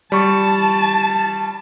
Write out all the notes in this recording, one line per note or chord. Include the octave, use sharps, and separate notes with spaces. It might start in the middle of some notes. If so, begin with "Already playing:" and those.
G3 A5 C#6